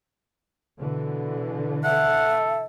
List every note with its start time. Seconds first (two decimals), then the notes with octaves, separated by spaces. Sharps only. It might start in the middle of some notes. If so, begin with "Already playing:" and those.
0.78 B2 D3 E3
1.84 A4 E5 F#5